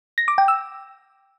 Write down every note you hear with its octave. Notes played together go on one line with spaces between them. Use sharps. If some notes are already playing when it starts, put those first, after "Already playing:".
A#6
D6
G5
E6